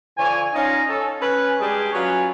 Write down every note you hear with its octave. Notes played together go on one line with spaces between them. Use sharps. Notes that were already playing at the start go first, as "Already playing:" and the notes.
D3 F3 C#5 D5 G#5
C#4 D#4 F4 C#5 D#5
C#4 A4
C#4 B4 G#5
G3 G#3 D4 G4 G#4
F#3 C#4 F4 B4 C#5 G#5